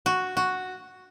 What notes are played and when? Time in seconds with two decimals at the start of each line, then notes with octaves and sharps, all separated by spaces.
0.06 F#4
0.37 F#4